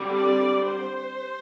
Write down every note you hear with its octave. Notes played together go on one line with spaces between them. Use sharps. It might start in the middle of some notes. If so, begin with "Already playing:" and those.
Already playing: D3 G3 C4
D5
C5